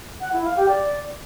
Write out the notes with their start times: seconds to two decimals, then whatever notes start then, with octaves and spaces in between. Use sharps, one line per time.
0.21 F#5
0.33 E4
0.45 F5
0.57 G4
0.69 D5